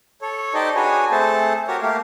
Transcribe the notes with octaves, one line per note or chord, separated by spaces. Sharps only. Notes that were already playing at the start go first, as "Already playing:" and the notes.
A4 C#5
D#4 G4 A4 C5 D5 D#5
D4 F#4 G#4 B4 C#5 G#5
A3 C4 G#4 A4 C5 A5
F#4 G4 A#4 C#5
A3 A#3 G4 F5